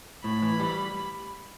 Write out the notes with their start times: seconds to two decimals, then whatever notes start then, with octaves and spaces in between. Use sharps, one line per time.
0.24 A2 B5
0.42 E3
0.60 G3